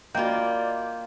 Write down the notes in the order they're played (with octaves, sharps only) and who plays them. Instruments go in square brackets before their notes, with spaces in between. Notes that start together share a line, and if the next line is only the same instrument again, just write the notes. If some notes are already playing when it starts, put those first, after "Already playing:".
[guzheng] A#3 F4 [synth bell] F#4 D#5 [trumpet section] D5 [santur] G5